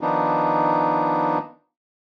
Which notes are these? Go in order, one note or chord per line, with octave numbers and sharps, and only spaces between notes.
D#3 F3 B3 D4 D#4